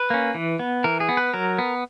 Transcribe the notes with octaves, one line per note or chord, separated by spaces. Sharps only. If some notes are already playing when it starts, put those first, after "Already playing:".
Already playing: B4
A#3 C#4
E3
B3
E3 A#4
G#4
B3
B4
F#3 A#4
B3